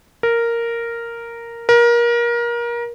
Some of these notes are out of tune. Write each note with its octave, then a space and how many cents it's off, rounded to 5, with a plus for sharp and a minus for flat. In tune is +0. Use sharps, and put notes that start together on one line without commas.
A#4 -5
A#4 +25